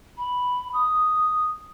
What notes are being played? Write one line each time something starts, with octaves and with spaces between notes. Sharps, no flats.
B5
D#6